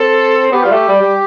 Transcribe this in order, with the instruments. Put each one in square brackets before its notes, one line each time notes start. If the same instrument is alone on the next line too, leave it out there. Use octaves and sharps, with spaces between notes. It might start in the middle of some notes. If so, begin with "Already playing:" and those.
Already playing: [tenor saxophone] C4 [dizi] A4
[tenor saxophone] B3 [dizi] G4
[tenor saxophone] G3 [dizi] F4
[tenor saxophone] A3 [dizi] G4
[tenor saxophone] G3
G3